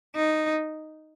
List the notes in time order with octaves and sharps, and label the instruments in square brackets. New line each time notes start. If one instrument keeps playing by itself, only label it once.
[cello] D#4